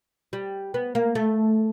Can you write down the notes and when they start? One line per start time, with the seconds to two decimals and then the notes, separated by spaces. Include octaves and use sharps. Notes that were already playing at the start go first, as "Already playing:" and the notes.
0.33 G3
0.74 B3
0.95 A#3
1.15 A3